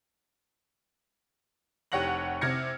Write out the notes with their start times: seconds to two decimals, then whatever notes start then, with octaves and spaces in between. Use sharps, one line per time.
1.92 F1 G4 C#5 F#5 A#6 F#7
2.41 C3 F6 G#6 A#6 C#7